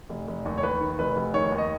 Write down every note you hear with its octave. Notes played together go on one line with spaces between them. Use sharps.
F1
F1
D#2
C#5
D#2 B4
D#3
F1 B4
F1
D#3 C#5
D#2
D#5